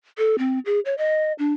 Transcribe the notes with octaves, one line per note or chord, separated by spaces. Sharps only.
A4
C4
G#4
C#5
D#5
D4